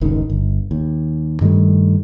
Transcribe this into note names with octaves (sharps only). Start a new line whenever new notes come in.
F1 C#2 G#2 D#3
G1
D#2
G2 D#3 G3 A3